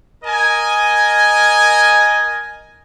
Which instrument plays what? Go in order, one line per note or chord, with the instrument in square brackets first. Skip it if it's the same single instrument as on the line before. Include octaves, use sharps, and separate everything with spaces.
[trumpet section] A#4 D#5 G#5